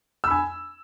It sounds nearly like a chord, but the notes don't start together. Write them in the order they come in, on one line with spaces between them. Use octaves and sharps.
E6 B5 G#5